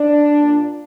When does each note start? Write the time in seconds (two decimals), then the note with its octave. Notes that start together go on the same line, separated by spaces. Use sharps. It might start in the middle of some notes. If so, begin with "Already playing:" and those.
Already playing: D4
0.39 A#2